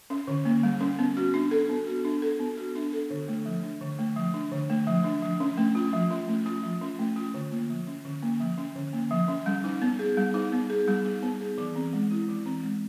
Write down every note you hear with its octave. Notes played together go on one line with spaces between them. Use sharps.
C#4
D3
A#3
G3
C#4
B3
F#4
D4
A4
B3
F#4
D4
A4
B3
F#4
D4
A4
D3
A3
F3
D4
D3
A3
F3
D4
D3
A3
F3
D4
F3
C#4
A3
F4
F3
C#4
A3
F4
F3
C#4
A3
F4
D3
A#3
F3
C#4
D3
A#3
F3
C#4
D3
A#3
F3
C#4
G3
D#4
B3
G#4
G3
D#4
B3
G#4
G3
D#4
B3
G#4
E3
C4
G#3
E4
E3
C4
G#3